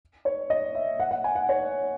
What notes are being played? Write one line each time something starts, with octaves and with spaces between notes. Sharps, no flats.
C#5
D#5
E5
F#5
F#5
G#5
F#5
C#5